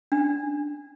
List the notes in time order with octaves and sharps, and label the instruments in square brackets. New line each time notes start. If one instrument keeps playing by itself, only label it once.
[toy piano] D4